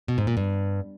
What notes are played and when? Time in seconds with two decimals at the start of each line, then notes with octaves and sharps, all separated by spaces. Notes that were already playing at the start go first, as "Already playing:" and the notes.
0.08 B2
0.18 G#2
0.27 A#2
0.37 G2